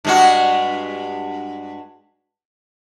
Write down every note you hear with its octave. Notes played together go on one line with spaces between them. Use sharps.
G2 G#3 F#4